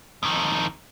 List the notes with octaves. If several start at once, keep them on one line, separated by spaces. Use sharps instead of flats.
F2 D#3